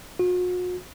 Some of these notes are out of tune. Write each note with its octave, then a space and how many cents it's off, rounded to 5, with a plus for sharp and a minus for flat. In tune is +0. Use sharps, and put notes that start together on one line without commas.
F#4 -40